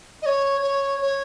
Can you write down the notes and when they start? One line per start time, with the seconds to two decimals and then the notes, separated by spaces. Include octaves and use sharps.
0.22 D#5
0.26 C#5
0.62 C#5
1.01 C#5